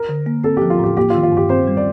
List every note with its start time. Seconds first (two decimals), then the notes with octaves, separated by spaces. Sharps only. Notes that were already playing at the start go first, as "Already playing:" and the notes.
Already playing: A#4
0.09 D3
0.26 A#3
0.44 C4 A4
0.57 F3 G4
0.70 F4
0.79 A2 G4
0.97 A#3 G4
1.10 F4
1.14 D#3
1.23 F4
1.32 G2 G4
1.49 C4 C5
1.67 G3
1.77 D5